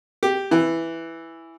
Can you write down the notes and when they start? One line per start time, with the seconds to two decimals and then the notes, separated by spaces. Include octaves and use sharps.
0.23 G4
0.51 E3